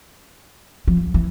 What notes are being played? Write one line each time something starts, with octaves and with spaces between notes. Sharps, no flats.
F3
E3